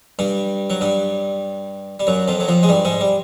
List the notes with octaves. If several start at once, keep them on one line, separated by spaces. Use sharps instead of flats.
G2 G3
F#3
G2 G3
G3
F#2 F#3
F2 F3
F#3
F2 F3
G#3
G2 G3
G#2 G#3
G3